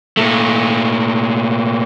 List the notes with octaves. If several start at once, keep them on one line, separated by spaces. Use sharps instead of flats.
A#2 A3